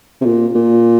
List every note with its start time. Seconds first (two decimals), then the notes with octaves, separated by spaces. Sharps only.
0.21 C3
0.25 A#2
0.55 A#2